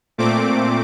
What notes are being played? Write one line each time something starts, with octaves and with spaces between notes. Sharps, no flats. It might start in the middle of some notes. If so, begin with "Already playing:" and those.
A#2 A3 C4 D6